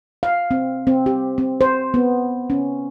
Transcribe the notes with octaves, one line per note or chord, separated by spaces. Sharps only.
F5
C4
C4
G4
C4
C5
B3
C#4